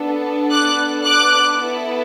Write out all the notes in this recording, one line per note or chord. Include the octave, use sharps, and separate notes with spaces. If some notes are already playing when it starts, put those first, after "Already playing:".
Already playing: B3 D4 A4
D6 F#6
D6 F#6
B3 E4 A4